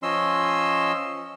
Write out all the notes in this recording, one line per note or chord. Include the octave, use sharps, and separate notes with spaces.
F3 C#4 D#5 C6 E6